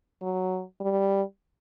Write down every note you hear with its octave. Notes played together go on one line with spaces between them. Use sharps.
F#3
G3